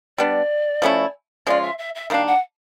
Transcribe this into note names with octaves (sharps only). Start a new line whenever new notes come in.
G3 B3 D4 D5
F3 A3 C#4 E4
F3 G#3 C#4 F4 D5
E5
E5
E5
D#3 G3 A#3 D4 F5
F#5